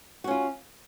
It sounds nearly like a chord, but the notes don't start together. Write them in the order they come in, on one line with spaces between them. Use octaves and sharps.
F#4 C#4 F4